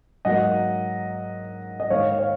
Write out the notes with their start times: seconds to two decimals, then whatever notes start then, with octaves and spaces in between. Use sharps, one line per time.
0.25 G#2 F#3 A#3 D#5 F#5
1.80 D#5
1.90 G#2 D#3 A#3 C#5 F5
2.18 C#5 F5